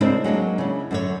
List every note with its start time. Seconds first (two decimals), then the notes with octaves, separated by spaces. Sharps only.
0.01 C#3 G#3 C4 D4 E4 A#4
0.24 F#3 G#3 A#3 D4
0.58 C#3 E4
0.91 F#2 D3 C#5